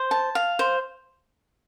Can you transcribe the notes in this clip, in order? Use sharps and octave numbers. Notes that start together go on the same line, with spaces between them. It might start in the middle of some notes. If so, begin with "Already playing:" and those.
Already playing: C5
A5
F5
C5